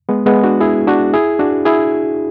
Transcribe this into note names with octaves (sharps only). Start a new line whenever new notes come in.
G#3 B3
G#3 B3
D4 F#4
E4 G#4
D4 F#4
E4 G#4
D4 F#4
E4 G#4